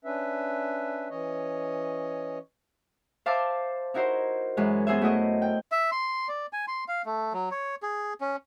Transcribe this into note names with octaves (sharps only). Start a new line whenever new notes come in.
C#4 D4 B4 E5
E3 C#4 C#5 D#5
C5 E5 F5 A5 C6 D6
D#4 E4 F#4 A#4 C5
F#2 E3 G#3
B3 F#4 G#4 C5 E5
A3 E4 F#4 D#5
G5
E5
C6
D5
G#5
C6
F5
A3
F#3
C#5
G#4
C#4